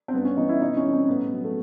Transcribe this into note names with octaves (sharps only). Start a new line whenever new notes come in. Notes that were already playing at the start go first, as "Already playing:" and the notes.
C4
G2 B3
C#4
E3 D#4
E4
B2 D#4
C#4
G3
C4
A2 B3
F#3
A3